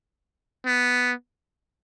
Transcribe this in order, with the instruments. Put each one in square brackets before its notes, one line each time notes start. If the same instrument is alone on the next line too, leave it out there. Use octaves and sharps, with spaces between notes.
[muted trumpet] B3